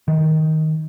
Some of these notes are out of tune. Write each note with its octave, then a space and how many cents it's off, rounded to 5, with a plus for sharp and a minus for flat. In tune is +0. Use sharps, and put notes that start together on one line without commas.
D#3 +10